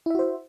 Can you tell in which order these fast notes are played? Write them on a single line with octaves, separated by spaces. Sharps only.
E4 E5 F#4 C5